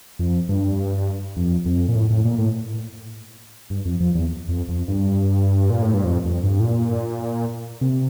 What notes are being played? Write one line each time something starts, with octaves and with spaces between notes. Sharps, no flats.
F2
G2
F2
F2
A#2
A2
A2
A#2
A2
G2
F2
F2
E2
F2
F2
G2
A#2
A2
G2
F2
F2
G2
A2
A#2
C3